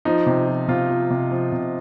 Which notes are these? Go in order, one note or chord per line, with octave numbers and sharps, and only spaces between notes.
F3 D#4
C3
F3
C3 F4
F3
C3
F3
C3